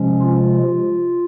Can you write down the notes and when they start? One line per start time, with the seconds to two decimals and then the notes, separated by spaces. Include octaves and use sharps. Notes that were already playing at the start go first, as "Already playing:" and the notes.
Already playing: C3 F3 G#3 C#4
0.22 F4